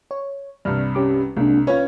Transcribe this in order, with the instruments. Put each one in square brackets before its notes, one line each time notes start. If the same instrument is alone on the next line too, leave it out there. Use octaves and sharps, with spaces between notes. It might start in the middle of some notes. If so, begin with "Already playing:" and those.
[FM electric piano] C#5
[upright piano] C2 G2 [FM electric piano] D5 F6
[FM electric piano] C#4 G4 D6
[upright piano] C2 [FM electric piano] G#3 A#3 D4
[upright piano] C#4 C#5 [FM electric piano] F4 B4